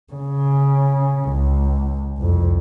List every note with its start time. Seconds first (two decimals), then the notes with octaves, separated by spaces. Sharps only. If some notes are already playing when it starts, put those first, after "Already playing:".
0.14 C#3
1.29 C#2
2.18 C2 F2